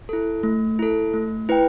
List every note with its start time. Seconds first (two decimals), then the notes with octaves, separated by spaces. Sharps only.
0.09 E4 A4
0.43 A3
0.79 E4 A4
1.13 A3
1.49 E4 B4 G5